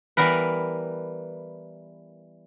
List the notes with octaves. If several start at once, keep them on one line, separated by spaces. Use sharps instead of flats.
E3 G3 B3 A#4 B4